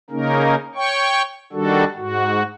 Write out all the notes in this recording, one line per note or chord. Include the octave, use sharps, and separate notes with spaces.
C#3 A#3 C#4 D#4 A#4
C#5 G5 C#6
D#3 G3 D4 F#4 A4
G#2 F#4